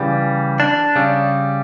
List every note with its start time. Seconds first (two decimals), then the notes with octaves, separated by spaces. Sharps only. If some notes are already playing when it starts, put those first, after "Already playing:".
Already playing: C#3 E3 G3
0.60 D4
0.95 C#3 G3